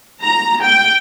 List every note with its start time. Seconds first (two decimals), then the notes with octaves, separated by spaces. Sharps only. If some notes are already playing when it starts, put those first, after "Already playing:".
0.21 A#5
0.63 G5